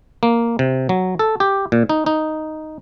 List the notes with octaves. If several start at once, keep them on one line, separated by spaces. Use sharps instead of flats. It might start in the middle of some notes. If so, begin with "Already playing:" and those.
A#3
C3
F#3
A4
G4
A#2
D#4
D#4